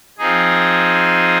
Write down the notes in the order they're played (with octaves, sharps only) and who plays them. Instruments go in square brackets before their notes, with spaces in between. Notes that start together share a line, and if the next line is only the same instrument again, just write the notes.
[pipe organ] F3 C4 D#4 G#4